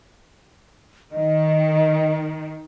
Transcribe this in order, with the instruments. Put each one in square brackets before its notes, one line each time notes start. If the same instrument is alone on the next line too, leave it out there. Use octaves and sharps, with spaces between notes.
[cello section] D#3 [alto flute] D#5